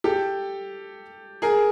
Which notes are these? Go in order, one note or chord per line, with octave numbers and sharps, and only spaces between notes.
G4 A4
G#4 A#4